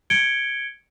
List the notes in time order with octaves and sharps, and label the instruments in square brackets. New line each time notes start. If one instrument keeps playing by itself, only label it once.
[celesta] G#6 C#7 D7 G7